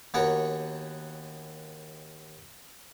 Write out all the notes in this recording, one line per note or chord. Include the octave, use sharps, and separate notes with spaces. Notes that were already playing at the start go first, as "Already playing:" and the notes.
D#2 B3 C#4 F#4 A#4